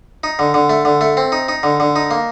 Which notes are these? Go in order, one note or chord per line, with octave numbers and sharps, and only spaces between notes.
D#4
D3
D3
A3
D3
A3
C4
D#4
D#4
D3
D3
D#4
A#3